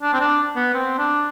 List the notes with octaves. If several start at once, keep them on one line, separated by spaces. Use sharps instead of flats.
D4
C4
D4
B3
C4
D4